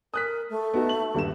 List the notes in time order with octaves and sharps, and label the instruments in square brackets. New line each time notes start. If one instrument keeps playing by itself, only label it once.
[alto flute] A#4 [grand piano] D#6 F#6 B6
[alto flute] A3
[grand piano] B3 D#4 F#4
F#7
D#1 G2 E7